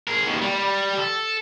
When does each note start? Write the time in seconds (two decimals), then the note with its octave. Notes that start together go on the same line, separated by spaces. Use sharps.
0.07 G#4 A#4
0.26 D#2 B2
0.41 G3
0.55 G3
0.98 A4